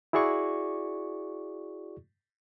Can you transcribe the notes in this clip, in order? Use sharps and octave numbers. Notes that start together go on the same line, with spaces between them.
E4 F#4 G#4 D5 C#6